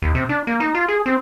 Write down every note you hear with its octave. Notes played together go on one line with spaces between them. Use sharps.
D#2
C3
D4
A#3
D#4
F4
G#4
C4